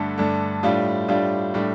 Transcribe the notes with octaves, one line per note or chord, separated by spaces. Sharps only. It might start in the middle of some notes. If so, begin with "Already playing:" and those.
Already playing: G2 D3 A3 D4
G2 D3 A3 D4
A2 G3 D4 F4
A2 G3 D4 F4
A2 G3 D4